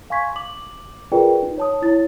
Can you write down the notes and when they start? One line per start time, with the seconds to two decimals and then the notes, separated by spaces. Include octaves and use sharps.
0.10 F5 G#5 C6 C#6 G#6 B6
0.36 D6 F#7
1.12 F4 G#4 A#4 B4 D5 G5
1.43 D#4
1.58 C#5 A5 D#6
1.82 E4 C#5 A6